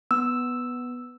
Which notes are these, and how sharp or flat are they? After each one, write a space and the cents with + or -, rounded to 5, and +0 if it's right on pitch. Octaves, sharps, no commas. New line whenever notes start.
B3 +0 E6 +0